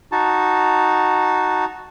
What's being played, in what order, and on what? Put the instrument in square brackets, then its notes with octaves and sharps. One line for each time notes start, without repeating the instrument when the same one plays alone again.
[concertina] D#4 F#4 A5